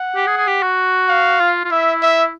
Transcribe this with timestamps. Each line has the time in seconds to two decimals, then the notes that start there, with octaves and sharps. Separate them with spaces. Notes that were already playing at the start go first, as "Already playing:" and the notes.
Already playing: F#5
0.16 G4
0.27 G#4
0.37 G#4
0.47 G4
0.63 F#4
1.09 F5
1.40 F4
1.65 F4
1.71 E4 E5
2.02 E5